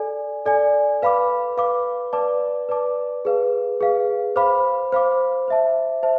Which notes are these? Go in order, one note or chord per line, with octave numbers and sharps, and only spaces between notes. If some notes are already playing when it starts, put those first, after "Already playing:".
Already playing: A4 D5 G#5
A4 D5 G#5
B4 F5 B5 D6
B4 F5 B5 D6
B4 D5 A5 D6
B4 D5 A5 D6
G#4 B4 F5
G#4 B4 F5
C5 F5 B5 D6
C5 F5 B5 D6
C5 E5 A5
C5 E5 A5